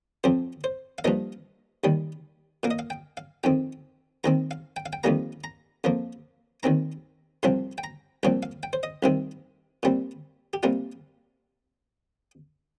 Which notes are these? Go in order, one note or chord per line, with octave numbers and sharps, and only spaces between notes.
F2 F3 C4 C5
C5
F5
G2 F3 A#3 D#5
D#2 D#3 G3
A#2 A#3 F5
D#5
F5
G5
F5
F2 D#3 C4 G5
D#2 D#3 C4 A#5
F5
G5
F5
G5
F2 D#3 G3 A#3 A#5
A#5
F2 F3 A#3
D#2 D#3 C4 A#5
C2 C3 F3 C4 C6
G5
A#5
C2 A#2 F3 C4 G5
F5
G5
C5
D#5
C2 C3 D#3 C4
A#2 G3 C4
G4
C3 G3 A#3 F4